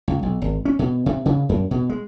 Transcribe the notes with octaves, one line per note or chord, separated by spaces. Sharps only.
C#2
B1
G#1
C#4
B2
C3
C#3
F#2
B2
G#3